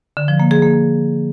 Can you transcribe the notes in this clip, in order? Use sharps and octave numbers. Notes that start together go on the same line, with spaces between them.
D3
F3
A#3
G#4
A#3